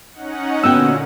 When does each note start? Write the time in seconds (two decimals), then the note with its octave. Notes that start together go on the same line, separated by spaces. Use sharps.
0.13 C#4 D#4 F#5
0.64 A#2 D3 B3 C#4 F#4 G5 E6